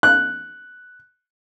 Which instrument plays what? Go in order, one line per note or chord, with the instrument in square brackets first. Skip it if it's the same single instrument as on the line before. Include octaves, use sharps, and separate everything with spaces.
[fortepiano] F#6